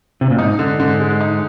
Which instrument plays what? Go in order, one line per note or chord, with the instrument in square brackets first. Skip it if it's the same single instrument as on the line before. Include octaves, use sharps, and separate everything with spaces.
[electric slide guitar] C3
A#2
[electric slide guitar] G#2 [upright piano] D#4
[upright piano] D3
[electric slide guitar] G#2 [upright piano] D3
[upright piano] G#3
D#4